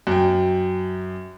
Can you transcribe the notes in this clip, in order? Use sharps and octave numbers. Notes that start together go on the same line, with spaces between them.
F#2 G5